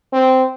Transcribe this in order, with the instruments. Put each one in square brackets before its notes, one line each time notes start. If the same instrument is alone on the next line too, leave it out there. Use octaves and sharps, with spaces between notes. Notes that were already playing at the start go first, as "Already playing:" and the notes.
[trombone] C4